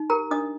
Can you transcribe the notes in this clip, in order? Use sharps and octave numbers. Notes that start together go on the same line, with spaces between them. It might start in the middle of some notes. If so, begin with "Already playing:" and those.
Already playing: D#4
G4 A#4 A#5
D4 D#5 D#6